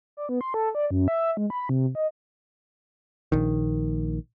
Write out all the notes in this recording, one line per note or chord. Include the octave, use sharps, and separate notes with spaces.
D5
B3
C6
A4
D5
F#2
E5
G#3
B5
C3
D#5
A#1 D#3